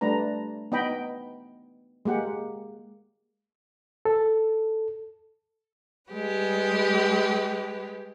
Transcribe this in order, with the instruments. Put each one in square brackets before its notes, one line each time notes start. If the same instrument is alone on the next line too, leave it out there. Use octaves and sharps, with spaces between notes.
[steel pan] G3 A3 D4 B4 A#5
B3 D#4 D#5 G5 B5
G#3 A#3 G4 F#5
[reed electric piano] A4
[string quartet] G3 G#3 G4 B4